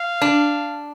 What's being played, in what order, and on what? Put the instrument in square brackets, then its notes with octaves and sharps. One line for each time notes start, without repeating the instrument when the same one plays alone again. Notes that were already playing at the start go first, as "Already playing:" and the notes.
Already playing: [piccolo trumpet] F5
[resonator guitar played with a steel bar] D4